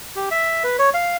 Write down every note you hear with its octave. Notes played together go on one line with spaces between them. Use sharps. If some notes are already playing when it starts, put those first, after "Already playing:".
G4
E5
B4
C#5
F5